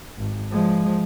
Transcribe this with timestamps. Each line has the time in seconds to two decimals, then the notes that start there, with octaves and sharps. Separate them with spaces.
0.18 G#1
0.51 F3 G#3